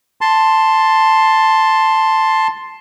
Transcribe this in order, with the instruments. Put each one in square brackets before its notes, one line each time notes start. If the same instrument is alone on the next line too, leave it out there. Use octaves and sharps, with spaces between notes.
[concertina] A5 C6